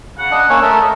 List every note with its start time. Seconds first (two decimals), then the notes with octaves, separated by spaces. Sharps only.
0.18 C#3 F#5
0.31 D4 D#5
0.50 A#3 C#4 C#5 E6
0.62 A3 A4 A#4
0.81 D#5